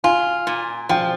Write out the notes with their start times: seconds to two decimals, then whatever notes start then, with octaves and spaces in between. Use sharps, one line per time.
0.04 F4 G#5
0.47 A#2
0.89 F3 G5